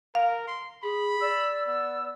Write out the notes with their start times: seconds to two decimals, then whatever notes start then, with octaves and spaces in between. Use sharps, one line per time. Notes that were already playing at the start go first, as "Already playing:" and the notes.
0.15 A#4 F5
0.47 C6
0.83 G#4 B5
1.21 D5 E6
1.67 B3 E6